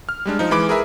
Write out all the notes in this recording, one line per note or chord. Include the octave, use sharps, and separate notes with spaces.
F6
G3 G#3 D4
F3 D#4
E3 G#3 B5 D6 D7
G#4 A#4 B4 E5